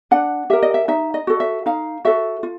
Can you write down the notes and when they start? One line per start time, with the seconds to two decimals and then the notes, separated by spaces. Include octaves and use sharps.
0.11 D4 F#5
0.50 G4 A#4 E5
0.63 D#5
0.74 E5
0.88 D#4 E5
1.14 D#5
1.27 F#4 A4
1.40 E5
1.66 D#4 F5
2.05 F#4 A4 E5
2.43 F4